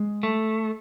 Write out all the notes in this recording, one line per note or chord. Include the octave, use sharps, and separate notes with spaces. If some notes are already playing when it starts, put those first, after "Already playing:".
Already playing: G#3
A3